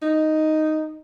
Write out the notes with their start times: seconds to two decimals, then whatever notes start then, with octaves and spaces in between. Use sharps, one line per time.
0.02 D#4